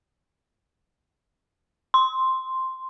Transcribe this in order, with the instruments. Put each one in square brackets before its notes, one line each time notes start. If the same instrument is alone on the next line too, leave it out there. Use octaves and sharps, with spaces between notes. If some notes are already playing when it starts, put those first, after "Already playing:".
[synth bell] C6